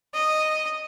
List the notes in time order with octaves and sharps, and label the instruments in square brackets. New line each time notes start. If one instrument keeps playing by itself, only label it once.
[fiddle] D#5